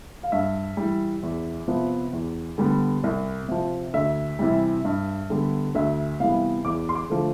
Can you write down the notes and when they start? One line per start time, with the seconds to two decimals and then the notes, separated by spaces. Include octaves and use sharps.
0.23 F5
0.32 G2 E5
0.77 E3 G3
1.23 E2
1.68 C3 F3 B3
2.13 E2
2.58 D3 G3 B3
3.04 C2
3.48 C3 F3
3.94 D2 E5
4.39 C3 E3 G3
4.85 G2
5.30 D3 G3 B3
5.75 D2 E5
6.20 C3 E3 G3 B3 F5
6.65 E2 D6
6.89 C6
6.95 D6
7.10 D3 F3 A3